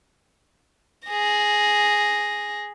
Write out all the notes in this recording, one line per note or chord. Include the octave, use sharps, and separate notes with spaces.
G#4 A#6